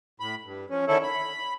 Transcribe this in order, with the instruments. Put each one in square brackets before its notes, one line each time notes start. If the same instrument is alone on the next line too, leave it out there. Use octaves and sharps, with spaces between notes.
[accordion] A2 B5
G2
F3 C#4
D3 D#3 C#4 E4 A4
B5